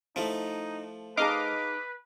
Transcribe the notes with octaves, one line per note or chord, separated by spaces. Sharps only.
F3 A3 D#4 E4
D#4 G#4 B4 D#5 F5 A5 D6